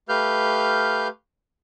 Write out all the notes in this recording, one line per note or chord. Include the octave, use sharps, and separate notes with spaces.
A3 G4 B4 F5 F6 G6